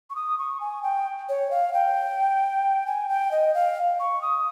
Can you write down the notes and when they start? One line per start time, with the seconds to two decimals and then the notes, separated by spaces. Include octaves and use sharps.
0.10 C#6
0.16 D#6
0.38 C#6
0.61 G#5
0.83 G5
1.29 C#5
1.51 F5
1.74 G5
2.86 G#5
3.09 G5
3.31 D#5
3.54 F5
4.00 C#6
4.22 D#6